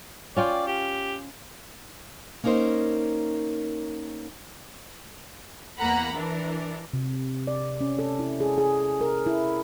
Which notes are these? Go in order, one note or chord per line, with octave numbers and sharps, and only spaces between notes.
C#4 F4 D5 G5
G4
A#3 C#4 D#4 A#4 C5
E2 A#3 F#5 A#5 B5
E3 D4 A#4
C3
D5
C#4
A4
E4
G#4
G#4
A#4
E4